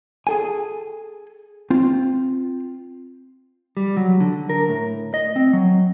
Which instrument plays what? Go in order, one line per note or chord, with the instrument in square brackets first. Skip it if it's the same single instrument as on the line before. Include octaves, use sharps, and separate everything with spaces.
[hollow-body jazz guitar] G#4 A4 G#5
C4 F4
[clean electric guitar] G3
F#3
D3
A#4
A2
D#5
C4
F#3